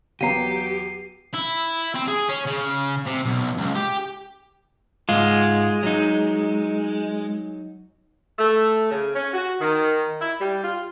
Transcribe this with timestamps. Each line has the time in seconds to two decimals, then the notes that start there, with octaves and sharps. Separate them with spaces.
0.21 E2 F#3 B3 G4 F5 A#5 C7 D#7
1.33 E4
1.95 C4
2.08 G#4
2.29 C#4
2.46 C#3
3.06 C3
3.26 B1
3.57 C#2
3.76 G4
5.09 G#2 G#3 F4
5.83 F#3 D#4
8.38 A3
8.91 C#3
9.15 C#4
9.33 F#4
9.60 D#3
10.21 E4
10.40 G3
10.63 F4